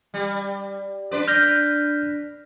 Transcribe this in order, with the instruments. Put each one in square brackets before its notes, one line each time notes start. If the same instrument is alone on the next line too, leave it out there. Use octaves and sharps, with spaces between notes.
[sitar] G3
D4 B4 D5
[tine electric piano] F6 G6 A#6